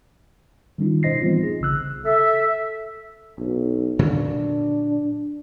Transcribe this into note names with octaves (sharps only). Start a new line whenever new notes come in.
D#3 G3 C#4 D#4 F4
B2 D#4 C5 D#5 A#6 C7
E3 G3 B3 C4 F4
G#4
A#1 C#3 E6 F#6
A4 E5
B1
A#2 D3 F#3 D4